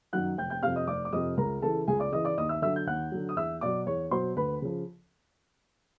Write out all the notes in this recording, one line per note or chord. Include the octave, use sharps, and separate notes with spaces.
F#2 D#3 F#3 F#5 F#6
F1 G5 G6
G5 G6
F2 C3 F5 F6
D#5 D#6
F1 D5 D6
D6
F2 C3 D#5 D#6
C#2 A#4 A#5
C#3 E3 A4 A5
C#2 G#4 G#5
D5 D6
C#3 E3 D#5 D#6
D5 D6
D#2 D#5 D#6
E5 E6
D3 F#3 E5 E6
G6
D#2 F#5 F#6
D3 F#3
D#6
E2 E5 E6
B2 F#3 D5 D6
E2 C#5 C#6
B2 F#3 C5 C6
D2 B4 B5
C#3 F3